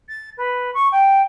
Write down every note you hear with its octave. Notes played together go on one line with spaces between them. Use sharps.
A6
B4
C#6
G5